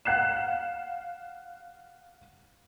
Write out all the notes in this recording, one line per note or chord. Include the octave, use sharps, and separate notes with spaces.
F5 F#5 F#6 C7 E7